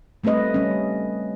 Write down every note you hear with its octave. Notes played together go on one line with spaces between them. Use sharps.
G3 A3 C4 B4 D#5
G3 C#4